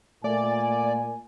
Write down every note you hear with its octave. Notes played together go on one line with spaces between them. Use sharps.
A#2 A3 D5 G#5